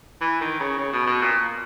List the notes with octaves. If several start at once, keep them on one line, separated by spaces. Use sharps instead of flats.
E3
D#3
C#3
C#3
B2
B2
A#2